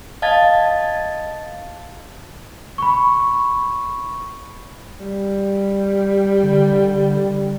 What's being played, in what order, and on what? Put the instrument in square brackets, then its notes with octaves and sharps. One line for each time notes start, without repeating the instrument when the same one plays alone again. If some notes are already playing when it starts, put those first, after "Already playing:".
[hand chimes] D#5 F5 A5 G#6 A6
[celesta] B5 C#6
[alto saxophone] G3
[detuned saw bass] D3